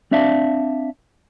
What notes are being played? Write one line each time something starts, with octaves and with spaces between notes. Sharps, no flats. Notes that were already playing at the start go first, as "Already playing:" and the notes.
C4 D4 D5 E5 F5 A5